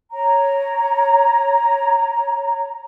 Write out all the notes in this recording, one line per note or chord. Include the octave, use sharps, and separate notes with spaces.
C#5 A#5